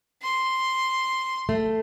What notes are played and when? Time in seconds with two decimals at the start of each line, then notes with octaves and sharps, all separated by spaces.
0.22 C6
1.49 A3